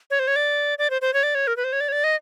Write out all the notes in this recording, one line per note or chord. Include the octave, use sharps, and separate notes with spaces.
C#5
C5
C#5
D5
D5
C5
C5
C#5
D5
C#5
A#4
B4
C5
C#5
D5
C#5
D5
D#5